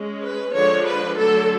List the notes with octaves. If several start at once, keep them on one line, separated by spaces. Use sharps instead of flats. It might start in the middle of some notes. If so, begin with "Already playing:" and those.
Already playing: G#3 C#4
B4
D3 F3 G#3 D4 C#5
B4
D3 F#3 A3 A4